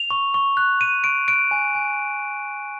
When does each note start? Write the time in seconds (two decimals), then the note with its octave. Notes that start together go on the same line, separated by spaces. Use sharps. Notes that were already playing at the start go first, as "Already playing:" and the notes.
Already playing: F7
0.11 C#6
0.34 C#6
0.57 F#6
0.80 C#6 D#7
1.04 C#6 D7
1.28 F#6 D7
1.51 G#5
1.75 G#5